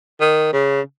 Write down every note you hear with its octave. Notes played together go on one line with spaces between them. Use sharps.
D#3
C#3